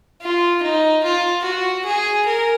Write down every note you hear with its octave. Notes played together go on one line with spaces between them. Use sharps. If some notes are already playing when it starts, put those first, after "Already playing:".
F4
D#4
F4
F#4
G#4
A#4